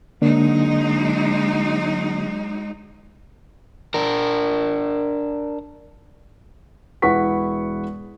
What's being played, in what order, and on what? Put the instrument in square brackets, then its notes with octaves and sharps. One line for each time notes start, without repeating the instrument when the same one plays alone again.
[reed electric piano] D3 A#3 D4 [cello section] F#3 G#3 D#4
[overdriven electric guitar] D4 A#4
[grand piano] E1 E4 B4 F#5 C#6 B6